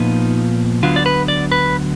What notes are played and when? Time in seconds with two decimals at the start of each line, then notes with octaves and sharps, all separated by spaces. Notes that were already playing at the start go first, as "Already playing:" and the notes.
Already playing: A#2 F3 B3 D#4
0.83 D2 D3 F#3 B3 F4
0.96 D5
1.06 B4
1.28 D5
1.52 B4